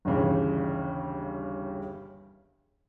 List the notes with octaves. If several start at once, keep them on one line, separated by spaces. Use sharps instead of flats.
G1 D#2 C#3 E3